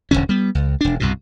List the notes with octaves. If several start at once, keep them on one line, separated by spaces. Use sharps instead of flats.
D#1 B1 D3 C#4
G3 B3
C#2
E1 D4
C2 G2 B2